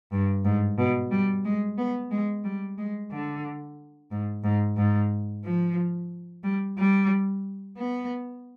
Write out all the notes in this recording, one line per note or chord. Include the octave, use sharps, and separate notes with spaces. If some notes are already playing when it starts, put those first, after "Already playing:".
G2
G#2
B2
G3
G#3
B3
G#3
G3
G#3
D3
G#2
G#2
G#2
F3
G3
G3
B3